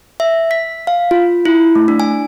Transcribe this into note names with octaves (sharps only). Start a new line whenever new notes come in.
E5
B6
F5
F4
E4
A3
D4
G#5